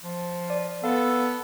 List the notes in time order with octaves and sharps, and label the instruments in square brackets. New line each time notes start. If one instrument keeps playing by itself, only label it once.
[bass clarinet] F3
[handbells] D5
[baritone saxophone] B3 [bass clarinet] A4 [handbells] F5